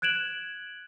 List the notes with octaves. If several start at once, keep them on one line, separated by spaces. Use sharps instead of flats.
F#6 G#6 D7 E7 F#7